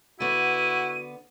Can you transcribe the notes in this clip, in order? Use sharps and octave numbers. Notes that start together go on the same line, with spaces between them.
D3 B3 E4 F#4 D#7